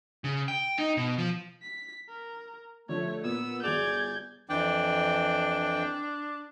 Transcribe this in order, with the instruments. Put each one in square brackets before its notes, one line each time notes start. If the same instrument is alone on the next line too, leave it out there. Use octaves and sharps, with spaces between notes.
[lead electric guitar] C#3
G5
D#4
B2
F3
[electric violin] B6
A#4
[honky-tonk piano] D3 F3 G3 [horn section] A3 [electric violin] C#5
[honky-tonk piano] A#2 [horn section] B3 [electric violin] E6
[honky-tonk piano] G1 F#4 F7 [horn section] G#4 D5 [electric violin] G6 G#6
[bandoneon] F2 E3 G5 [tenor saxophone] D4